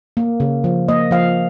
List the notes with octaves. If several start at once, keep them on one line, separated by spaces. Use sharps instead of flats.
A#3
C#3
F3
A#3 D#5
F3 F5